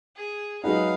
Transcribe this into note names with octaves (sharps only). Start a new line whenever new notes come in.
G#4
F#3 G#3 D#4 G#4 B4 F5 F#5